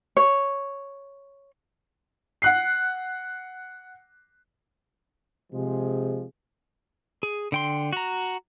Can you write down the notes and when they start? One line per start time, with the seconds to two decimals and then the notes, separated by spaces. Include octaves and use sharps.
0.17 C#5
2.42 F#5 F#6 C7
5.53 C3 F3 G#3 G#4
7.23 G#4
7.52 D3 G5 C6
7.93 F#4 A#5